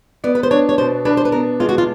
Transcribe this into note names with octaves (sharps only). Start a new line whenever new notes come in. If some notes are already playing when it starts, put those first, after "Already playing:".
B3 D5
B4
C5
D4 C#5
C#5
B2 C5
D4 B4
C5
B4
B3 A#4
G#3 F4
F#4
F4